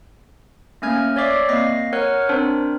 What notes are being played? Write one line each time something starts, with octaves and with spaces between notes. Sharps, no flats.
A3 A#3 C#4 G#5 F6 G#6
C#5 D5 E5 D6 C7
A#3 C4 D#5 A#6 C7
A#4 C#5 F#5 F6 F#6
C4 D4 A#4 C5